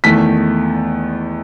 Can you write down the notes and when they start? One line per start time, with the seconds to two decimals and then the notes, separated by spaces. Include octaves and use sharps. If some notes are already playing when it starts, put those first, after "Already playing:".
0.04 E2 D#3 A3 B6